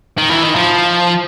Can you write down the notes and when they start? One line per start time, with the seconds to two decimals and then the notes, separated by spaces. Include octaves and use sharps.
0.18 D#3
0.29 E3
0.43 D#3
0.55 F3